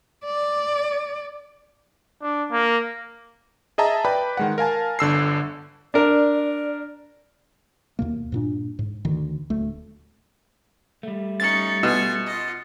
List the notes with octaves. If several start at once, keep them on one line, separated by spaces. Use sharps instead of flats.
D5
D4
A#3
G#4 D#5 E5 A5 A#5
B4 D5 G5 B5
D#3 G#3 F#5
A#4 F5 G#5 A5
G1 D3 E6 C7
D4 A#4 D5
D#2 B2 A#3
G2 A#2 D4
G#2
D2 D#3
D1 D2 A3
G3 A3
C#4 D#4 A6 C#7
B2 F4 G#5
F4 D#5